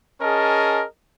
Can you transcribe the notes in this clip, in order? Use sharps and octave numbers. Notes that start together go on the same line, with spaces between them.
C#4 G#4 A#4 D#5 A5